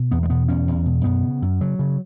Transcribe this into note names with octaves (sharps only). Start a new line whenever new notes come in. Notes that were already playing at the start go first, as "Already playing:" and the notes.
Already playing: B2
E2 B3
G#3
B2 B3
E2 C#4
E2
B2
F#2 B3
C#3
F#2
C#3 F#3
C#3